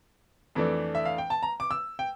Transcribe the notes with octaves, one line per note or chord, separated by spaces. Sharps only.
F2 E3 A3 D4
E5
F5
G5
A5
A#5
D6
E6
G5